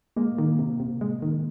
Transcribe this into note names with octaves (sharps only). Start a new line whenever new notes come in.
G#3 A#3
D#3
C3
C3
G#3
D#3